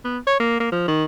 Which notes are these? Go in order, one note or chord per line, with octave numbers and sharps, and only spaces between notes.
B3
C#5
A#3
A#3
F3
D#3